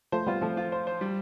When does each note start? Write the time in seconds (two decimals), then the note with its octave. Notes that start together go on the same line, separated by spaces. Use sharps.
0.12 F3 A3 C5
0.27 G3 B3 F4
0.41 F3 A3 C4
0.57 F4
0.72 C5
0.87 C5
1.01 G3